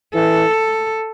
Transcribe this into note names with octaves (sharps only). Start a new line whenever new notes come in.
E3 A4